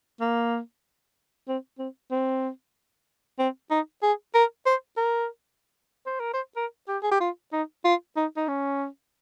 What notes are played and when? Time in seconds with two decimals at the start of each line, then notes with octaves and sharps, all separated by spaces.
0.20 A#3
1.48 C4
1.79 C4
2.11 C4
3.39 C4
3.70 D#4
4.03 G#4
4.34 A#4
4.66 C5
4.97 A#4
6.07 C5
6.20 A#4
6.33 C5
6.56 A#4
6.88 G4
7.03 G#4
7.11 G4
7.20 F4
7.52 D#4
7.84 F4
8.16 D#4
8.37 D#4
8.48 C#4